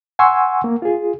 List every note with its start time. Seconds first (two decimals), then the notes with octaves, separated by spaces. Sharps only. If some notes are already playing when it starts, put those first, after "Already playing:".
0.19 F#5 G#5 C6 C#6 E6
0.64 A#3
0.82 F4 G#4